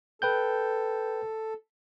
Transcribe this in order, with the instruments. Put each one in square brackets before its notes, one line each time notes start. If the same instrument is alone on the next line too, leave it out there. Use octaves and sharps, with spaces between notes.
[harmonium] A4 [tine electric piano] B4 G5 G6